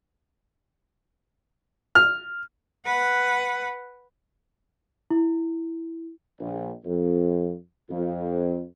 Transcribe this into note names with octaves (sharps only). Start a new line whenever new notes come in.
F6
B4 F#5
E4
A#1
F2
F2